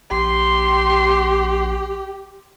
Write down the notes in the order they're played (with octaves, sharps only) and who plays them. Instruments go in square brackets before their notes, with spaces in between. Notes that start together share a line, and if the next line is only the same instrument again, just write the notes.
[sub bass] A#1 [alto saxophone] G4 [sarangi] C6